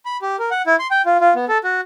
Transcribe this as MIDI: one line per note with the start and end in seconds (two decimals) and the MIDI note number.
0.05 0.17 83
0.22 0.36 67
0.39 0.50 70
0.51 0.62 78
0.66 0.76 64
0.79 0.87 84
0.91 1.02 79
1.05 1.17 65
1.21 1.34 65
1.35 1.45 59
1.48 1.58 69
1.64 1.81 66